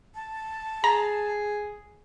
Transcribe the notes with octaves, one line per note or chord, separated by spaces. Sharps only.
A5
G#4 A#5